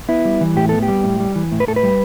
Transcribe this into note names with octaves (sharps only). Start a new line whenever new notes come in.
B3 E4
G3
E3
A2 G4
B3 A4
G4
G3
A2
G3
E3
A2
B4
A2 A4
B4
G3